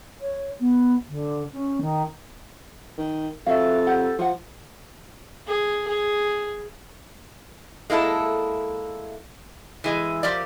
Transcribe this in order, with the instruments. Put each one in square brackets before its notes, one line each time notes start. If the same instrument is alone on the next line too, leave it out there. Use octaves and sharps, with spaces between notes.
[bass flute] C#5
B3
D3
C#4
D#3
[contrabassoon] D#3
[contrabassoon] F2 [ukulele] F#4 E5 F5 [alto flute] A4
[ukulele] G4 F#5
[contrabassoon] F3 [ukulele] F4 F#5
[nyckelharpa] G#4
G#4
[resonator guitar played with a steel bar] G#3 A#3 E4 A4
E3 G#3
F3 G4 A#4 D5